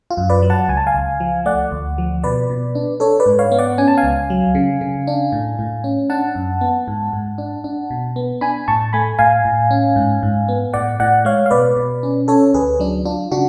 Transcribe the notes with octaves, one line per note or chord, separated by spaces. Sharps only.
F4
F#2
B4 D5
F#3
F#5 A5
C#2 G#5
A5
F5 G#5
C#2
F3
A3 D5 F#5
D2
F3
B2 B4 D5
B2
D4
D4 A4 C#5
B4 D5
G#2
C#5 F5
B3
D5 F#5
C#4 G#5
A5
F5 G#5
C#2
F#3
C#3
C#3
D4
A2
A2
C#4
D4 F#5 A5
F#2
B3
G#2
G#2
D4
D4
B2
B3
D4 G#5 B5
A2 A5 C#6
A3 G#5 B5
A2 F5 G#5
A2
C#4
G#2
G#2
B3
A2 D5 F#5
A2 D5 F#5
G#3 C#5 F5
F5
B2 B4 D5
B2
C#4
C#4 A4 C#5
D2 G#4 B4
F#3 D4
D4 F4
C#3 D4 F#4